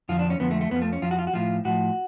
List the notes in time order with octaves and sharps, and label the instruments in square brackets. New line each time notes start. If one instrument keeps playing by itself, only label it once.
[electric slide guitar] F2 D3 F3 F4
D4
C#4
F2 D3 F3 B3
A3
A3
F2 F3 B3
A3
C#4
F2 F3 F4
F#4
F4
F#4
A2 F3 F4
A2 F3 F#4